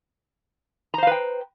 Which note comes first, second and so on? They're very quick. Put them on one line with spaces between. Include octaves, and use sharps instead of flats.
A#5 C5 F5 B4 G5